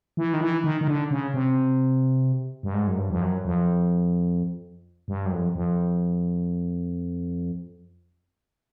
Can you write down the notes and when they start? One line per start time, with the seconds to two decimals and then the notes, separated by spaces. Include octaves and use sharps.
0.17 E3
0.34 D#3
0.41 E3
0.64 D#3
0.81 D#3
0.88 D3
1.11 C#3
1.34 C3
2.63 G2
2.74 G#2
2.87 F#2
2.97 G2
3.10 F2
3.21 F#2
3.45 F2
5.08 G2
5.26 F#2
5.32 F2
5.55 F2